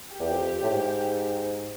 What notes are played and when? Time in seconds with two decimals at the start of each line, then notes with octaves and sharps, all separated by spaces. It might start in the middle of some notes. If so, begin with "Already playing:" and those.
0.11 G4
0.20 E2
0.31 F2
0.63 A2
0.70 G#2